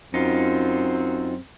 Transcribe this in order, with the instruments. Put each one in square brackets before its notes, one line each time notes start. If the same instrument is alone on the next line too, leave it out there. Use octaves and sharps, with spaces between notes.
[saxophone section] F#2 C4 [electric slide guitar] D#4 F4